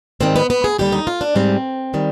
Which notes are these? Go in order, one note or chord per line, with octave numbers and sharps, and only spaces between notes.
G#2 D#3 G3 C4
B3
B3
G#4
D#2 D3 G3 G4
D#4
F4
D4
G#2 G3 C4
D#3 G3